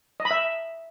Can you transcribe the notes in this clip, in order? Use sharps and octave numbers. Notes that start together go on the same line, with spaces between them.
D#5
B5
E5